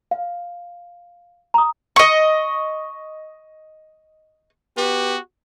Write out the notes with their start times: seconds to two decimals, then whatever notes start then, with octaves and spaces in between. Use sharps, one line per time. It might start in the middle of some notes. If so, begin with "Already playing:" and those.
0.11 F5
1.54 A#5 D#6
1.96 D#5 C#6
4.77 B3 F#4 G4